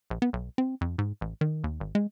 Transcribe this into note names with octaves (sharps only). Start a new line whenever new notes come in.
A#1
B3
B1
C4
F2
G#2
A1
D#3
D#2
G#1
G#3